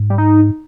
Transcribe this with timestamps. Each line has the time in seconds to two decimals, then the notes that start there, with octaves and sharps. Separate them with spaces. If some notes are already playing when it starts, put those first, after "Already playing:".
Already playing: G#2
0.10 G3
0.18 D#4